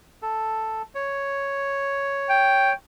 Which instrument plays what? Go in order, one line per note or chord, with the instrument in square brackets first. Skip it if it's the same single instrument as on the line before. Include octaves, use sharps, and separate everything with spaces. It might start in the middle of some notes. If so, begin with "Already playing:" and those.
[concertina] A4
C#5
[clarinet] G5